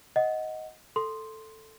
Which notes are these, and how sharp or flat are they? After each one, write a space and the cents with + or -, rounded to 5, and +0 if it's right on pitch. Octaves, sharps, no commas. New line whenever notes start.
D#5 +10 F#5 +0
A4 +0 C6 +0